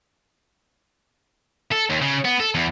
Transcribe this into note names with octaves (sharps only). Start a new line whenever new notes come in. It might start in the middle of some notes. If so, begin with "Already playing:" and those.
A4
D#2
C#3
B3
A4
E2